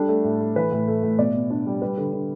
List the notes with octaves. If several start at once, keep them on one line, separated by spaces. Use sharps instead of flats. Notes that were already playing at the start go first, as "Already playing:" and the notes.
Already playing: G3 D4 A4
A3
A2
A3
E3 B4
A2
A3
A2
B2 D5
B2
D4
G3
G3 B4
D3
D3